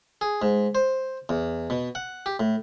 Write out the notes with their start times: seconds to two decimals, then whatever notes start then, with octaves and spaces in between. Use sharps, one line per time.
0.21 G#4
0.42 G#2
0.75 C5
1.29 E2
1.70 B2
1.95 F#5
2.26 G4
2.40 A2